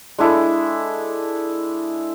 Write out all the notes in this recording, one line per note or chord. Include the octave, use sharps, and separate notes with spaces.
G#3 D4 E4 A4